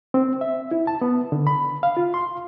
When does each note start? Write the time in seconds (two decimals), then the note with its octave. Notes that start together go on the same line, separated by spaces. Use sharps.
0.14 C4
0.41 E5
0.71 E4
0.87 A5
1.01 B3
1.32 D3
1.47 B5
1.83 F5
1.97 F4
2.14 C6